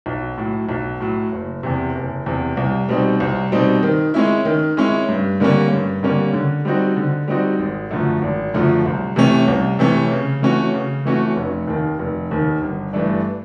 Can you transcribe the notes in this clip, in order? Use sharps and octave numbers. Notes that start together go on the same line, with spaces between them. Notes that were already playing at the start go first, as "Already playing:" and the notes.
B1
A2 F#3
B1
A2 F#3
F#1
E2 C3
F#1
E2 C3
C2
B2 G3 C4 D#4
C2
B2 G3 C4 D#4
D#3
G#3 C#4 E4
D#3
G#3 C#4 E4
G2
D3 G3 A#3 C#4
G2
D3 G3 A#3 C#4
D3
G3 C4 D#4 F#4
D3
G3 C4 D#4 F#4
G#1
F#2 D3 F3 A3
G#1
F#2 D3 F3 A3
C2
C3 E3 A3 C#4
C2
C3 E3 A3 C#4
C#3
E3 A3 C#4 F#4
C#3
E3 A3 C#4 F#4
F1
D#2 D#3
F1
D#2 D#3
G1
G2 E3 A3 D4